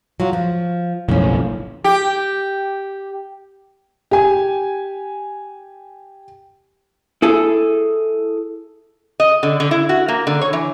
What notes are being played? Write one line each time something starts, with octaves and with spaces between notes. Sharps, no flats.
F#3 F4 F#4
F3
F#1 B1 A2 F3 C#4
G4
G4 G#5
E4 G#4 A4
D#5
D3
D3
E4
F#4
A#3
D3
C#5
E3